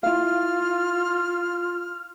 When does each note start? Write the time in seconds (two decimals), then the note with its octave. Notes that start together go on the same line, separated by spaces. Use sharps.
0.03 E4 F4 F5 F6